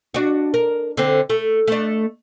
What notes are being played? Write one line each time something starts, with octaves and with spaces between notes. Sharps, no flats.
D4 F#4
A#4
D3 C4
A3
A3 D4